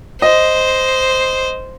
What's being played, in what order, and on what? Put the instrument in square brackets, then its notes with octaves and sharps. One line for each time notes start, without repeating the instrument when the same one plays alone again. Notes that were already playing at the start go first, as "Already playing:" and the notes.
[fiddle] C5 [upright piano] D#5